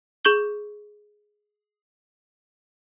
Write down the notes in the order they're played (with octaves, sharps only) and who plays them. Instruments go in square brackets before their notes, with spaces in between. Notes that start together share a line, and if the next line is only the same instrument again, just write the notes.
[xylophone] G#4 C#6 G6 F#7 G7